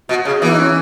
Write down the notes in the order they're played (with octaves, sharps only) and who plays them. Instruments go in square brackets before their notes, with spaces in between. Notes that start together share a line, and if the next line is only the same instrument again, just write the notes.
[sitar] B2 [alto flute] F#4
[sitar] C#3 [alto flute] G#4
[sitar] E3 [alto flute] B3
[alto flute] D#4
C#4